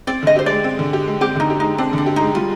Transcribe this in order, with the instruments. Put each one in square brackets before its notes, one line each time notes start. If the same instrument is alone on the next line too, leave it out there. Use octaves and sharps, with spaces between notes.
[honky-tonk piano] C4 [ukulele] D5
[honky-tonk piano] D3 [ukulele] D#5
[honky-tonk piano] G4 [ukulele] C5
[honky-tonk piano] G#3 [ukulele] D5
[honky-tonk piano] C4
D3
G4
G#3
[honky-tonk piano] C4 [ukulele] G4
[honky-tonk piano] D3 [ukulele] D#4
[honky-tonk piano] G4
[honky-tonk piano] G#3 [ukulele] D#4
[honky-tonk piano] C4 [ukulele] D4
[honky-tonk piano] D3 [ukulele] D4
[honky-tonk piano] G4
[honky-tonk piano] G#3 [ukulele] D#4
[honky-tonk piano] G3 [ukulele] F4